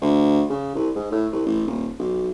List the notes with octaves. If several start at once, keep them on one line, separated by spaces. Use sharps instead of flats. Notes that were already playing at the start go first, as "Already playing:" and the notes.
D2
C#3
C2
G#2
A2
C2
A1
D#1
B1